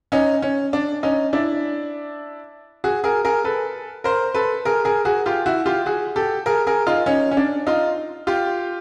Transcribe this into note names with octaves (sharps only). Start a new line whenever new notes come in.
C#4 D#4
C#4
D4
C#4 D#4
D4 E4
F#4 G#4
G#4 A#4
G#4 A#4
A4 B4
A#4 C5
A4 B4
G#4 A#4
G#4 A#4
F#4 G#4
F4 G4
E4 F#4
F4 G4
F#4 G#4
G4 A4
G#4 A#4
G#4 A#4
D#4 F4
C#4 D#4
C#4
D4
D#4 F4
F4 G4